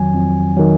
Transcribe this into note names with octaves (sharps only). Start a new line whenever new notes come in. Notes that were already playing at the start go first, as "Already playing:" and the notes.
Already playing: F2 D#3 F#3 G#5
F2
D#3 F#3